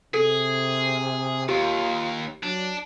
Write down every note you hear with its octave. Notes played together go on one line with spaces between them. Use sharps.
C3 G#4 A4
D#2 F4 G4
F#3 D4